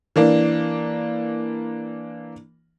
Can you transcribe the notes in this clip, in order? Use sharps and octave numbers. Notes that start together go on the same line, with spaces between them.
E3 A#3 D4